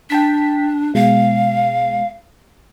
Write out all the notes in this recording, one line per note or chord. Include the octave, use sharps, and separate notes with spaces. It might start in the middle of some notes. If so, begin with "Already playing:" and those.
D4 G5 A5 B6
B2 G#3 F5